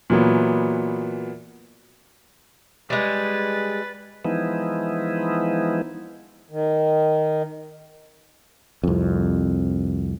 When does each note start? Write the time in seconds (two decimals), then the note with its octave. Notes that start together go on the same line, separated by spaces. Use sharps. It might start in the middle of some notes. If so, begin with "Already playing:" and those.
0.10 A#2 E3 F#3 B3
2.90 G3 G#3 B4 A6
4.25 E3 F3 G#3 B3 D#4 E4
6.51 D#3
8.83 C2 F2